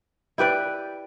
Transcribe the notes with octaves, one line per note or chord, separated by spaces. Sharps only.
E4 G4 B4 D5